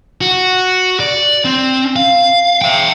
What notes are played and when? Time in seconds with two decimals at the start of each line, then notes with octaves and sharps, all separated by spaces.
0.21 F#4
1.00 D5
1.45 C4
1.96 F5
2.62 E5 G5